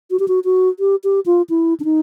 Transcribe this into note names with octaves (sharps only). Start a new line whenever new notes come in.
F#4
G4
F#4
F#4
G4
G4
F4
E4
D4
D#4